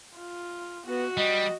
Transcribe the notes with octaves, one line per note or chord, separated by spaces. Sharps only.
F4
B3 F#4
G3 D#5